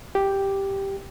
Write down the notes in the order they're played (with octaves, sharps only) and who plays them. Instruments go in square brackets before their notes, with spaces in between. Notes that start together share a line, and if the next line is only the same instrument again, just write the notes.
[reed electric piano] G4